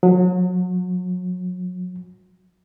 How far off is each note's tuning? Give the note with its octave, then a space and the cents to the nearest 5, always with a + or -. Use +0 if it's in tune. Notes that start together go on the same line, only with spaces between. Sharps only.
F#3 -35